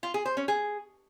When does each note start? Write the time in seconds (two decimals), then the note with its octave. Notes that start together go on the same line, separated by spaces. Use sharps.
0.03 F4
0.14 G#4
0.25 C5
0.37 C#4
0.48 G#4